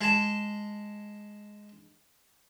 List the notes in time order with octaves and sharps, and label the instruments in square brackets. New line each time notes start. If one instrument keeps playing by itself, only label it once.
[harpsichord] G#3 A5